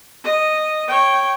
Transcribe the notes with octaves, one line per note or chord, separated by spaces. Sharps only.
D#5
C#5 G5